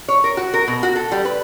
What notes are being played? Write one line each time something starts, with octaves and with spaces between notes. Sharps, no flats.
C#5
A#4
F#4
A#4
B2
F#4
A4
G3
B4